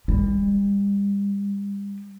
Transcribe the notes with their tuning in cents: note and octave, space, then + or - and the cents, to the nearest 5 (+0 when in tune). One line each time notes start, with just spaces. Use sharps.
G3 +35